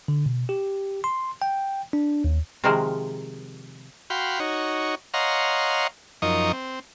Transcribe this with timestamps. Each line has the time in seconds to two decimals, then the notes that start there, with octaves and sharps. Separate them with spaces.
0.08 D3
0.26 B2
0.49 G4
1.04 C6
1.42 G5
1.93 D4
2.24 D#2
2.64 C3 D#3 F3 G#3 A#4 C5
4.10 F#4 F5 G5 B5 C6
4.40 D#4 F#4 C#5
5.14 C#5 D#5 F5 F#5 A#5 C6
6.22 F#2 F3 D#4 A#4 D#5 C#6
6.53 C4